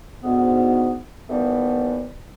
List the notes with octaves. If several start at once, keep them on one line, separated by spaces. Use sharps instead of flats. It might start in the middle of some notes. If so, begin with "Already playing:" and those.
D2 G#2 B3
D#2 E3 G3 A3 B3